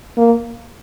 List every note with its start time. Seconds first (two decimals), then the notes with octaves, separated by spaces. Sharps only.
0.17 A#3